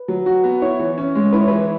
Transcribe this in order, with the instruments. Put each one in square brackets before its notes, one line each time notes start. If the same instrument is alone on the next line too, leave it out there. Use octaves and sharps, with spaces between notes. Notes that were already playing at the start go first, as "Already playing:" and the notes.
Already playing: [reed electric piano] B4
[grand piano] F#3
F#4
B3
[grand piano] E4 [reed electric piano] C#5
[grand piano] E3
C#4
G#3
[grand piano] E4 [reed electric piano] B4
[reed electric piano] C#5
[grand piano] E3 [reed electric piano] B4